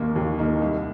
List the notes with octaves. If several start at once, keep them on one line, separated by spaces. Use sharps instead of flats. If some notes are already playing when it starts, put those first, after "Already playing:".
Already playing: D#2 D#3 A#3 D#4
D#2
D#3 A#3 D#4
C2